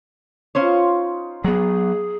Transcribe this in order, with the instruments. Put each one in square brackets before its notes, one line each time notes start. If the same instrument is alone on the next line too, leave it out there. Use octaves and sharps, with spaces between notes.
[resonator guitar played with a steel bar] C#4 C5 C#5 [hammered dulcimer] D#4 F4 F5
[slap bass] F#3 B3 [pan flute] G#4